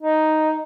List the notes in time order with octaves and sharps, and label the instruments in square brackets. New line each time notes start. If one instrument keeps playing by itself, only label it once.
[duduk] D#4